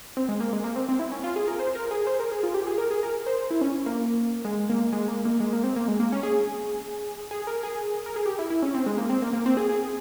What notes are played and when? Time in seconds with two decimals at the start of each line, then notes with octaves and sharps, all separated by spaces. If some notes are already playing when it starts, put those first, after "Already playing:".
0.17 C4
0.29 G#3
0.40 A#3
0.53 G#3
0.64 A#3
0.76 C4
0.89 C4
0.99 E4
1.12 C#4
1.24 F4
1.36 G#4
1.48 A#4
1.59 C5
1.75 A#4
1.91 G#4
2.07 C5
2.20 A#4
2.32 G#4
2.43 F4
2.54 G4
2.67 G#4
2.78 A#4
2.91 G#4
3.03 A#4
3.26 C5
3.51 E4
3.61 C#4
3.86 A#3
4.45 G#3
4.70 A#3
4.93 G#3
5.08 A#3
5.25 A#3
5.40 G#3
5.53 A#3
5.64 C4
5.76 A#3
5.88 G#3
6.00 A#3
6.12 C#4
6.23 G#4
7.31 G#4
7.47 A#4
7.63 G#4
8.06 A#4
8.16 G#4
8.26 G4
8.39 E4
8.50 E4
8.63 C#4
8.74 C4
8.86 G#3
8.98 A#3
9.10 C4
9.22 A#3
9.33 A#3
9.46 C4
9.57 G#4
9.69 G#4